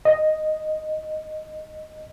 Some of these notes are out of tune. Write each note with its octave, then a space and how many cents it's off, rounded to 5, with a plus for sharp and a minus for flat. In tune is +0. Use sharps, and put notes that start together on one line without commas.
D#5 +0